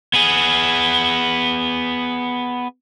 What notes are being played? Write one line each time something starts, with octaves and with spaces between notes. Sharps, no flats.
B3 G#4